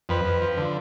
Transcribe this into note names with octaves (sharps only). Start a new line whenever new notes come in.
F2 B4
F2
F3
D3